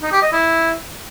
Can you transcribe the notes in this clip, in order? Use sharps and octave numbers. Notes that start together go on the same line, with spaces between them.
D#4
G4
D#5
E4